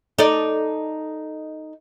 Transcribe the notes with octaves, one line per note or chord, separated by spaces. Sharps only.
D#4 A4 D5